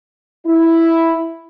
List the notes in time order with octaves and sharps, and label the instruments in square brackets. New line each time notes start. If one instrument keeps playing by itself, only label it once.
[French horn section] E4